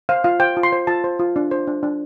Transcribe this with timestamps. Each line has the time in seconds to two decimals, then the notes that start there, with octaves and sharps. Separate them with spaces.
0.09 C5 F5
0.24 F4 F5
0.40 C5 G5
0.57 F4
0.63 C6
0.72 C5
0.87 F4 A5
1.04 C5
1.19 F4
1.36 D4
1.51 C5
1.67 D4
1.83 D4